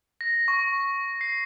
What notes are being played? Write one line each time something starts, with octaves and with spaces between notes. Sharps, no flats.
A#6
C#6
C7